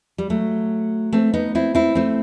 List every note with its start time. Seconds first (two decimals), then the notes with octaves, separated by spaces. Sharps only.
0.18 G3
0.30 F#3 A3
1.13 A3 C4
1.34 B3 D#4
1.55 C4 E4
1.75 C4 E4
1.95 A3 C4